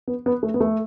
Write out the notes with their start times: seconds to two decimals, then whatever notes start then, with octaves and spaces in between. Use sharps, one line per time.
0.08 B3
0.26 B3
0.43 A3
0.54 B3
0.61 A3